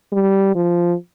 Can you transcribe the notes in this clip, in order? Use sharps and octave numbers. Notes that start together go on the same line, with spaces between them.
G3
F3